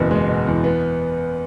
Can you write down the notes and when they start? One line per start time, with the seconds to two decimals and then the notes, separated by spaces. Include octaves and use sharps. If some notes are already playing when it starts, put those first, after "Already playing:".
Already playing: F#1 E2 B2
0.11 G#3
0.29 B2
0.47 E2
0.64 B3